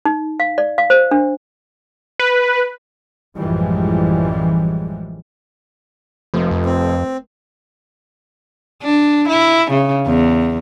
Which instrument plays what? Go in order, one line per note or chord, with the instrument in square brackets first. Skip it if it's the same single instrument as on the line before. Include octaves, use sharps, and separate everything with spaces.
[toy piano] D#4
F5
D5
F5
C5
D4
[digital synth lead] B4
[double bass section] A1 F#2 E3 F3 G3 G#3
[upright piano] F1 [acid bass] F3
[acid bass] F2
[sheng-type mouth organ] C4
[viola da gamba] D4
E4
C#3
E2